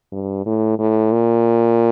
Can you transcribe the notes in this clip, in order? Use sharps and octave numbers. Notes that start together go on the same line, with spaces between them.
G2
A2
A2
A#2